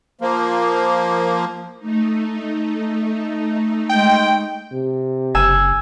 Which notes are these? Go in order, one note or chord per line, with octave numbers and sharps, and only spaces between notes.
F3 A#3
A3 D#4
G#3 G5
C3
F#1 G#5 E6